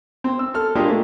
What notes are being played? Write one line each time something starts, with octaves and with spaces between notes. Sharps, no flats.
C4
E6
A4 F6
G#3 A#3 D4 F4 G4 G#4
A3